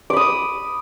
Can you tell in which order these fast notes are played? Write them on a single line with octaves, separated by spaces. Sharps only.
D6 B5 D#6